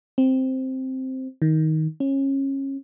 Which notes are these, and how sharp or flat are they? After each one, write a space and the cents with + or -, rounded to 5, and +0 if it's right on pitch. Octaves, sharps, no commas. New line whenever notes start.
C4 +0
D#3 +15
C#4 -25